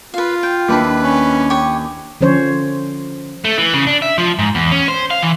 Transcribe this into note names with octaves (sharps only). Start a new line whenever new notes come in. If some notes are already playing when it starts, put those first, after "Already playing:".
F4 B4 F5
G5
D#2 D4 E4 B4
C#4
G4 C#5 D#5
D3 F3 C#4 C5 C#5
A3
E3
C#3
D4
E5
F3
G#2
E2
C#4
C5
F5
E3